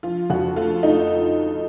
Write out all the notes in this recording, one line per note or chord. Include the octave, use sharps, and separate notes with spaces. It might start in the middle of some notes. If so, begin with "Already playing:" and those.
F3 F4
F2 F#4
A3 F4
A3 D#4